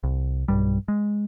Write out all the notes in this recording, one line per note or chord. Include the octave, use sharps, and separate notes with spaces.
C2
B1 E2 G2 G3
G#3